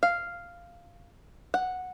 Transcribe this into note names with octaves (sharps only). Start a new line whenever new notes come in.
F5
F#5